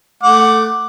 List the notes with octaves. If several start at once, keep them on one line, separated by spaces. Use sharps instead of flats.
A3 F#5 D6